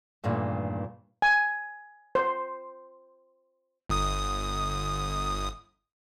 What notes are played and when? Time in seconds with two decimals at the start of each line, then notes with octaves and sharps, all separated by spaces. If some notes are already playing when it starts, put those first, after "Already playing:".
0.24 E2 G2 A#2 D#3 A3
1.22 G#5
2.15 C5
3.90 G1 D#6